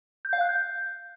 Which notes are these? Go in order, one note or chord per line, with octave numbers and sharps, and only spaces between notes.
G6
F5
F#6
G6